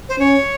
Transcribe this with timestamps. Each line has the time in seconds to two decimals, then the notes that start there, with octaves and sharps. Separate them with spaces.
0.09 C5
0.19 C#4 C#5